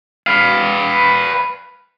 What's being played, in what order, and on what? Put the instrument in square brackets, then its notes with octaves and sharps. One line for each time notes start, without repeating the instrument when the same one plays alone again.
[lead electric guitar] B4 F5